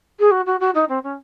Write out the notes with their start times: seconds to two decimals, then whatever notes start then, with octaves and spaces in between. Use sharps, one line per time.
0.19 G#4
0.31 F#4
0.46 F#4
0.60 F#4
0.74 D#4
0.89 C4
1.03 C#4